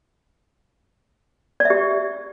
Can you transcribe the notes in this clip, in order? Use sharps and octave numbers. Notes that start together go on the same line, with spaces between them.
D5
E5
G4